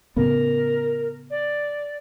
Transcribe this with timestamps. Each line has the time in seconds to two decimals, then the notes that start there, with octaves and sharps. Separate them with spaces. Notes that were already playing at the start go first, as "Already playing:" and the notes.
0.16 A2 C#3 B3 A#4
1.30 D5